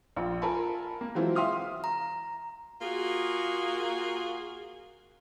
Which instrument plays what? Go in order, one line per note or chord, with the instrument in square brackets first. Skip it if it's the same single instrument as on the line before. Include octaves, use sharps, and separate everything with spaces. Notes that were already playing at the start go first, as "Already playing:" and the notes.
[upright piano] A#1 F4
F4 A4 A#4 G#5 A5 B5
A#3
E3 F#3 G#3 C4 E4 F4
E5 F5 C6 D#6 F6
[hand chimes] A#5
[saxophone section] A#3 F4 F#4 G#4